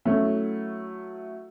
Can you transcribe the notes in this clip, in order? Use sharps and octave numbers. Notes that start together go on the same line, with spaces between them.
F#3 A3 C#4 E4